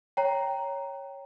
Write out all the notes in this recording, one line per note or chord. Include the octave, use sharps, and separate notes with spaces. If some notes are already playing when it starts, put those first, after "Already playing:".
C#5 G5 A#5